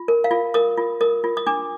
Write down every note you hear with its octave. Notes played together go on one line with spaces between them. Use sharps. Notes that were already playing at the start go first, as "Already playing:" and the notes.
Already playing: F4
A#4
F5
F4
A#4 D#6
F4
A#4 D#6
F4
D#6
D4 D6